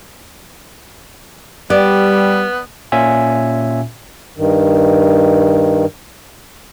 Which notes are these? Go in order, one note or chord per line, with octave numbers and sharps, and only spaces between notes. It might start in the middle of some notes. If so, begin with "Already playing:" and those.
G3 B3 D5
A#2 C#4 F4 E5 G#5
G2 D#3